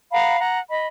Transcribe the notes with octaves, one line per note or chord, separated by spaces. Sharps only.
F5 F#5 A#5 B5
F#5 A#5
D#5 B5